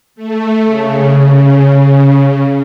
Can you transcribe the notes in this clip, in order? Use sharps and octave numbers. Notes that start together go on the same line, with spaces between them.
A3
C#3